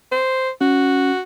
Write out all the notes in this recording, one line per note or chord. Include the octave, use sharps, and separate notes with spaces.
C5
C#4 F#4